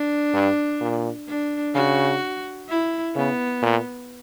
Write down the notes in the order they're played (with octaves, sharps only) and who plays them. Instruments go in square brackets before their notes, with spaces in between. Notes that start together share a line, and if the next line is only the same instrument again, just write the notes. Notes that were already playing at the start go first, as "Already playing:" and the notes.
Already playing: [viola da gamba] D4
[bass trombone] G2
A#2
[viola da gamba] D4
[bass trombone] C#3 [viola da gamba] F#4
[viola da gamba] E4
[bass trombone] C#3 [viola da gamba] B3
[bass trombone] A#2